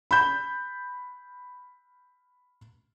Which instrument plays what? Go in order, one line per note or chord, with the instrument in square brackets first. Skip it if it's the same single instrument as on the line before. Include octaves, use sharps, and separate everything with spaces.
[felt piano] B5 G6